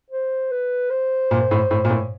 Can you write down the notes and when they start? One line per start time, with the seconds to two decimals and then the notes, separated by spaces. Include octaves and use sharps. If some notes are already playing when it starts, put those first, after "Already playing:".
0.10 C5
0.51 B4
0.90 C5
1.31 A#2
1.51 A2
1.71 A2
1.85 A#2
1.90 A2